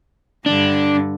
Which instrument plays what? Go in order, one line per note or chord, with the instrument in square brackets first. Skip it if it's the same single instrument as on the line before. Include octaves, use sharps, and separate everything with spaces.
[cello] G2 D3 [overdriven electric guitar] D4